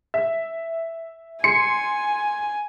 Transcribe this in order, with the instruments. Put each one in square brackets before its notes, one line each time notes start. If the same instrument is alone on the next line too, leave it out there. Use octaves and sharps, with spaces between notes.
[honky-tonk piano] E5
[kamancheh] G#5 [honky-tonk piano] C6 C7 C#7